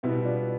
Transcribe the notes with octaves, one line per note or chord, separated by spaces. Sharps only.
B2 G3 B3 C4 E4
D4 F4